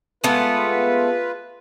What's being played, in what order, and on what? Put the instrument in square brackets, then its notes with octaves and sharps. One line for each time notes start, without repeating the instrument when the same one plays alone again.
[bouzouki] G#3 A3 B3 [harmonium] F4 B4